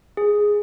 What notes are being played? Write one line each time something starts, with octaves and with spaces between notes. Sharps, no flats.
G#4